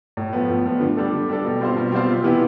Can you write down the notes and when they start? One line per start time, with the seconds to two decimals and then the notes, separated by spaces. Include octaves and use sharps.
0.17 A2
0.33 F3 B3
0.49 A2
0.66 F3 B3
0.81 D3
0.97 G3 D4 A4
1.13 D3
1.29 G3 D4 A4
1.45 B2
1.61 G3 C4 F4 C5
1.77 B2
1.92 G3 C4 F4 C5
2.09 C3
2.24 E3 B3 E4 G4